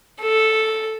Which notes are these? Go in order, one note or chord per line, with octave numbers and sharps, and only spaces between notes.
A4